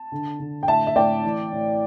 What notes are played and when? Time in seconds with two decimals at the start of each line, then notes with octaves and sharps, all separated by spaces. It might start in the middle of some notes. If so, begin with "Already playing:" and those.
Already playing: A5
0.12 D3
0.39 D3
0.63 G5
0.68 A2 E5 A5
0.87 E5
0.96 A2 D5 G5
1.24 A1
1.52 A2